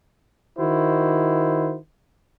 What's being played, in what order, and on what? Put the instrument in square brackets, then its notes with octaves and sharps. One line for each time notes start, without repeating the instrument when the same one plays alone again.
[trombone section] D#3 E4 F#4 C5